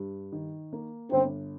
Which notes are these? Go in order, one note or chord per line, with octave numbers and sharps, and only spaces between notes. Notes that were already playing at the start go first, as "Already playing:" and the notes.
Already playing: G2
D#3
A#3
G1 C4